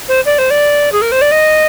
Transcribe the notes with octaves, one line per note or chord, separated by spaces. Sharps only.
C5
D5
C5
D5
G#4
A#4
C5
D5
D#5